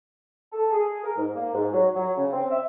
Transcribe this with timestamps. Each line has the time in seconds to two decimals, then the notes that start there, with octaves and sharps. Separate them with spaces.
0.53 A4
0.72 G#4
1.04 A#4
1.16 G#2
1.35 A#3
1.53 G#2
1.72 F#3
1.95 F#3
2.17 C#3
2.33 C4
2.51 E5